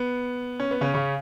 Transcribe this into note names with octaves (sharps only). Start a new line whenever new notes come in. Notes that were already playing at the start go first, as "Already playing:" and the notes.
Already playing: B3
C#4
B3
C#3 C#4
C#3 C#4